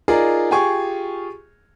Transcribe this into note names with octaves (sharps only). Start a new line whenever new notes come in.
D#4 F4 G#4 A#4 D5
F4 G4 G#4 G#5 C#6